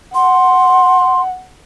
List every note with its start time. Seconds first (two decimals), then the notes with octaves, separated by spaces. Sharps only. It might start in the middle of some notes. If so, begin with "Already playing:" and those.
0.14 F#5 C6